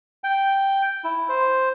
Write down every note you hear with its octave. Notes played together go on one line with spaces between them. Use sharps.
G5
E4
C5